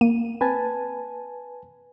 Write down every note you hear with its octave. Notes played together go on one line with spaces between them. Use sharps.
A#3 D#7
C4 B4 G#5 A5